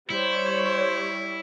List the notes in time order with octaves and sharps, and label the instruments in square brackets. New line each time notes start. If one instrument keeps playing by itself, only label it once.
[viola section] G3 [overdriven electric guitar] E4 [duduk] C5 [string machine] C#5